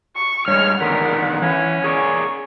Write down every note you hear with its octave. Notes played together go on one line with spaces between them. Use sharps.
C#6
G2 G#3 C#5 F6
E2 D3 D#3 A#4 F#5 B6
E3 C#4 G#6
G#4 A#4 D5 C#6